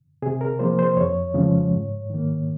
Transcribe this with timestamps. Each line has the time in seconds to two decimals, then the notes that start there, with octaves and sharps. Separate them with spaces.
0.22 C3 G#4
0.41 A#4
0.59 F3 A#3 C5
0.79 C5
0.97 F2 C#5
1.34 C#3 F3 G#3
1.72 G#2
2.10 D#3 A#3